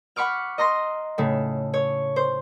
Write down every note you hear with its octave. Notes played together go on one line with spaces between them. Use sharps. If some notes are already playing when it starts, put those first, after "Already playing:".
F#5 B5 C#6 D6 F6
D#5 A#5 C6 A#6
A2 C#3 A3
C#5
C5